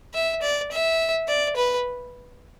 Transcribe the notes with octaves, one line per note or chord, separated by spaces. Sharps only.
E5
D5
E5
D5
B4